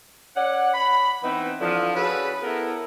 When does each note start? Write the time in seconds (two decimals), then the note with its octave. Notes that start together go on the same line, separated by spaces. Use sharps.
0.36 C#4 D5 F#5
0.73 B5
1.23 E3 B3 C4 D#4
1.61 D3 E3 F3
1.95 C#4 F#4 G#4 A4 B4
2.43 B3 E4 A4 A#4